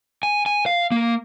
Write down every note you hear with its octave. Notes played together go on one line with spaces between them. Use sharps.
G#5
G#5
F5
A#3